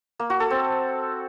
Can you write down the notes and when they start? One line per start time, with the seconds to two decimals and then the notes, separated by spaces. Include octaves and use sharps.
0.19 A#3
0.30 F#4
0.40 A4
0.50 C4